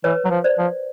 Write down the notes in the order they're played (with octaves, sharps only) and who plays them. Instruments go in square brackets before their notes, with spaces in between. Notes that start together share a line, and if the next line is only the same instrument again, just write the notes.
[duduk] E3 [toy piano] B4 C#5
[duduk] F#3
F3
[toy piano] C5 D5
[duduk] F3